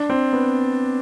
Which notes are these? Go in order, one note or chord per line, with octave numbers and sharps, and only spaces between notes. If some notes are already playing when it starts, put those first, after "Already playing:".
Already playing: D4
C4
B3